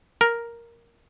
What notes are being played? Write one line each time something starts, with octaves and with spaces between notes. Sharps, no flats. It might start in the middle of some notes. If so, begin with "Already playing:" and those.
A#4